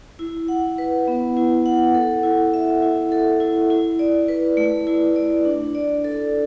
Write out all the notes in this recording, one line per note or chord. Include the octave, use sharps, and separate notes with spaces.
E4
F#5
B4
B3
E4
F#5
A4
E4
E5
E4
A4
E4
E4
D5
B4
A3
E4
D5
D4
D5
A4